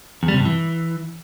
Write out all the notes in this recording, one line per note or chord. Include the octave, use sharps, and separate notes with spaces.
E2
G3
C3
G2
E3